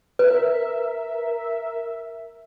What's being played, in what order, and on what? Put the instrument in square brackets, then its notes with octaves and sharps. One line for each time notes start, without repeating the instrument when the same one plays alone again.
[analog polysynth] A#4 E5 [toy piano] B4